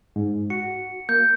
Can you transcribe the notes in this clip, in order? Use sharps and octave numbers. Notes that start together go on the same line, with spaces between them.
G#2
F#4 C#7
A#3 G6